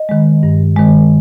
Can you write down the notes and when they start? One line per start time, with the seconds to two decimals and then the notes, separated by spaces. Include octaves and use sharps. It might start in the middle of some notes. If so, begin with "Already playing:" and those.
Already playing: D#5
0.09 D#3 G#3
0.43 G2
0.76 D#3 G#3